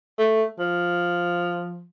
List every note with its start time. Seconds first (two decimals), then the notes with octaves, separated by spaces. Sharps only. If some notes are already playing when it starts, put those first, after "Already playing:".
0.19 A3
0.59 F3